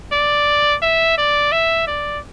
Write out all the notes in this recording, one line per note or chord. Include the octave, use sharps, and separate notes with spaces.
D5
E5
D5
E5
D5